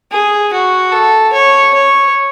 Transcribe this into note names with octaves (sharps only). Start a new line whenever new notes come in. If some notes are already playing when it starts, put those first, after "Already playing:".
G#4
F#4
A4
C#5
C#5